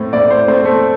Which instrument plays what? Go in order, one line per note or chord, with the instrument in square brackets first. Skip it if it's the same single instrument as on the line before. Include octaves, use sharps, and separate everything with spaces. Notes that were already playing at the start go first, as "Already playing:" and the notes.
Already playing: [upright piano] A2 A3 C4
[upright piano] A2 [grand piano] D5
[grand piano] C5
[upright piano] A3 C4 [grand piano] C5
[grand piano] A3